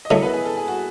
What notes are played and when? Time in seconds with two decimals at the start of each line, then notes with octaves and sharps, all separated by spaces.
0.05 D#5
0.11 D#3 F#3 A3 E4 E5
0.22 B3 B4
0.33 G#4
0.45 A4
0.57 G#4
0.68 F#4